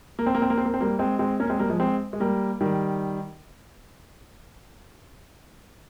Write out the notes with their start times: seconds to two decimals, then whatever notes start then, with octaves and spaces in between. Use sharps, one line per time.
0.19 A#3
0.26 C4
0.35 A#3
0.42 C4
0.50 A#3
0.57 C4
0.65 A#3
0.74 C4
0.81 G3 A#3
0.99 G#3 C4
1.19 G#3 C4
1.40 A#3 C#4
1.50 G#3 C4
1.59 G3 A#3
1.70 F3 G#3
1.80 G#3 C4
2.13 G#3
2.20 G3 A#3
2.61 D#3 G3